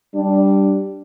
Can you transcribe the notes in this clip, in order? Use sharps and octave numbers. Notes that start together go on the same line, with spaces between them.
G3 D4